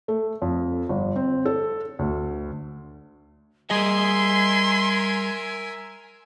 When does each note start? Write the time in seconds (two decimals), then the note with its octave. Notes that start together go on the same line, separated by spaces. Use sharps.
0.08 A3
0.42 F2
0.89 G1
1.16 C4
1.46 A4
1.99 D2
3.70 G3 G#4 A#4 D#5 E5 G#5 C6